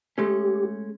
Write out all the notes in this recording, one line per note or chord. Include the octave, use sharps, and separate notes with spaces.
G#3 A3 C#4 G4